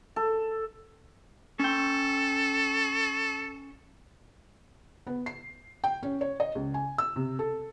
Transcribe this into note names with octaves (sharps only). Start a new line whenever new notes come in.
A4
C#4 A4 G5
B3
C7
G5
C#4
C#5
D#5
C#2
G#5
E6
C3
A4